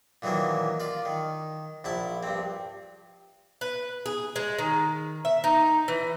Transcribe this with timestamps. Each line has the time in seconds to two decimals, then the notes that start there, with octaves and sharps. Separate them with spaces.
0.22 A#2 D#3 E3 F#3 A#3
0.80 F4 D5
1.05 D#3
1.84 A#1 E4 A5
2.23 G2 C4
3.61 B4
4.06 G#4
4.36 G#3
4.58 D#3
5.25 E5
5.44 D#4
5.88 E3